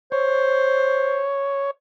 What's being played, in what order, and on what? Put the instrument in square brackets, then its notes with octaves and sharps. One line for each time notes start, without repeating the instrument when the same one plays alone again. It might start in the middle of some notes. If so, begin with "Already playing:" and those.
[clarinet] C5 [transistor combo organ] C#5